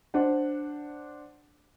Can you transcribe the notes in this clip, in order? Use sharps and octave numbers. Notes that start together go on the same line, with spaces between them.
D4 C5 F#5